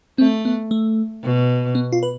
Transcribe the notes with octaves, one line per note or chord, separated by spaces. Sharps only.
A3 C4
B3
A3
B2
B3
F4
B4